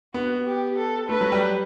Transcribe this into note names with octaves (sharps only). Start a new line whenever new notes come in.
B3 F#4
G4
A4
A3 B4
F#3
G3